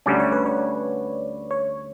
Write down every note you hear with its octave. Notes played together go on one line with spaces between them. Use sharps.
D2 D3 G3 C#4 D5
C#5
B4
C#5
C#5